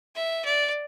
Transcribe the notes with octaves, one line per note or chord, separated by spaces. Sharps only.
E5
D5